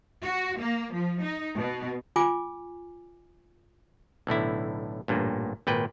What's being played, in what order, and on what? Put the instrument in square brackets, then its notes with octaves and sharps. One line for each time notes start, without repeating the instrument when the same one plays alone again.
[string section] F#4
A#3
F3
D#4
B2
[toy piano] F4 G#5 D6
[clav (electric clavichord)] B1 A2 D3 E4
A1 G2 A#2
G#1 A#2 B4 G5